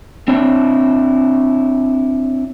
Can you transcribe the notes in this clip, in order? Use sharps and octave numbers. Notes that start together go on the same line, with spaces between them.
C4 D4 E4 C#5